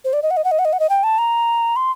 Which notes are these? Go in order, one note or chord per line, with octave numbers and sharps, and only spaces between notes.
C5
D5
D#5
F#5
D#5
F#5
D#5
F#5
D#5
F#5
D#5
G5
A5
A#5
C6